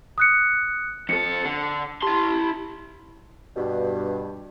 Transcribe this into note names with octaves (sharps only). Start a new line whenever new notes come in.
D#6 F#6 C#7
F2 A4 C#7
D3
E4 G4 A5 C6
G2 B2